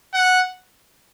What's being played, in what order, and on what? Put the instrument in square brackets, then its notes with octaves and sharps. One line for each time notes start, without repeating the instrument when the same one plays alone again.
[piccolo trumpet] F#5